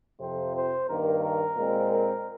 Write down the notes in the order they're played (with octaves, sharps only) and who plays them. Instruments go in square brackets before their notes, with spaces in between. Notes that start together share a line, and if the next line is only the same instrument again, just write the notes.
[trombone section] F2 C3 F3 C4 C5
C5
G2 D#3 A#3 A#4
A#4
A#2 G#3 C4
A#4